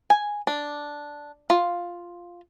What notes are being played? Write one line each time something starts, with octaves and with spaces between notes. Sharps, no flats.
G#5
D4
F4